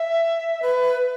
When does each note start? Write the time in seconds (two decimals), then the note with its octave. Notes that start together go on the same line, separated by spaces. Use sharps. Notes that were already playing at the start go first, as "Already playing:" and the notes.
Already playing: E5
0.62 B4